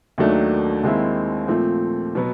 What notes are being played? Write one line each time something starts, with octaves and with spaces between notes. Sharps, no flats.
D#2 D#3 F#3 A3 D4
D#2 D#3 G#3 C4 E4
A#2 F3 A3 C4
B2 F#3 B3